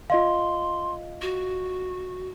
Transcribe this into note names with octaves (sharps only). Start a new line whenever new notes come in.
F4 D#5 F5 C6
F#4